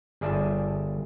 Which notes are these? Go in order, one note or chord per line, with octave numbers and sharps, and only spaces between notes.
G1 G#4 D5 E5 A5